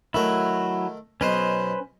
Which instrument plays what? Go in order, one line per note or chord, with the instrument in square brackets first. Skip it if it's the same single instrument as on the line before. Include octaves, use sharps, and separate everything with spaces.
[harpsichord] D#3 A3 A#4 [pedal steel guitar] F#3 E4
[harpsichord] B1 B2 D#5 [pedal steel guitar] C#4 B4 C5